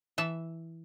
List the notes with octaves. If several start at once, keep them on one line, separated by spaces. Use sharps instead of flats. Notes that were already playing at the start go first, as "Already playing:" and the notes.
E3 E5 A5